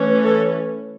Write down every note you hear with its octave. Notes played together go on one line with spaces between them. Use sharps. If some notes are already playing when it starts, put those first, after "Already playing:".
Already playing: E3 A3 C#4
A4